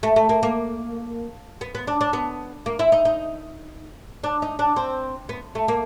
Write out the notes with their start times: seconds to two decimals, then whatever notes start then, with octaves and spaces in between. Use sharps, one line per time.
0.03 A3
0.16 A3
0.29 A#3
0.43 A#3
1.61 B3
1.75 B3
1.87 D4
2.01 D4
2.13 B3
2.66 A#3
2.79 E4
2.92 D#4
3.05 D#4
4.24 D4
4.42 D#4
4.59 D4
4.76 C4
5.29 B3
5.55 A3
5.68 A#3